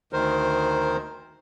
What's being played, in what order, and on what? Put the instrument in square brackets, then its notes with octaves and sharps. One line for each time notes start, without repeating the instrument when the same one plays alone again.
[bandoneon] D2 D#3 A#4 C5